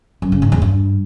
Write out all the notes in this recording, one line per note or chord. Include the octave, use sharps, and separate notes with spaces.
F#2
C#3
G#2
E2
G2